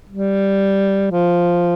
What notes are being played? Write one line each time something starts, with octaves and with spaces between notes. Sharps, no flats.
G3
F3